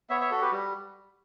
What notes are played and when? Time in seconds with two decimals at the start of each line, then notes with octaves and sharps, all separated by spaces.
0.09 B3 C#5 E5
0.20 C#5 E5
0.31 F#4 A4
0.41 G4 B4
0.52 G3